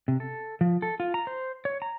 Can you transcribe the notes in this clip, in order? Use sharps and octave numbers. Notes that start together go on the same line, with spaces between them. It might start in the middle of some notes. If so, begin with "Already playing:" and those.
C3
A4
F3
A4
F4
A#5
C5
C#5
A#5